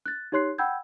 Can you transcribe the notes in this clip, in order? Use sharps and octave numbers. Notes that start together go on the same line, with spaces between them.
F#6 A6
D#4 G4 C#5 C6 F#6 C7
F#5 G5 B5 E6 G6 G#6